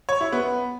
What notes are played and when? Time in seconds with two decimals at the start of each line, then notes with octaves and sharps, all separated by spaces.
0.09 C#5
0.21 E4
0.33 B3